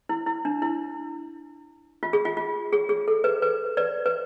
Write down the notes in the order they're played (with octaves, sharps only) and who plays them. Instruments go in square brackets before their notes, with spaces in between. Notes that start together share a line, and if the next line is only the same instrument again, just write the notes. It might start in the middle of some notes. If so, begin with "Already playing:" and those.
[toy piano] E4
E4
D4
E4
F4
G#4
F4
F4
G#4
G#4
A4
B4
B4
B4 D5
B4